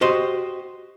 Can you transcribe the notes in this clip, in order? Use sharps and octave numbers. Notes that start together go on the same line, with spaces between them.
F#4 G4 C5 D#5